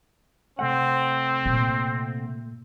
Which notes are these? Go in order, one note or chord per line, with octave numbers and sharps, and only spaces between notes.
C3 A3 C4 F#5
A#2